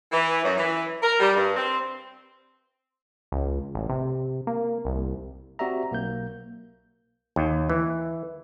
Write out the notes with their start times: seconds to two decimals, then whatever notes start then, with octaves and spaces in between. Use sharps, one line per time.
0.12 E3
0.43 F#2
0.57 E3
1.02 A#4
1.20 G3
1.36 G2
1.57 C4
3.32 C#2
3.75 A1
3.89 C3
4.47 A#3
4.85 C2
5.59 C4 F#4 G4 D5 E5 A#5
5.92 B1 A#3 G6
7.36 D#2
7.70 E3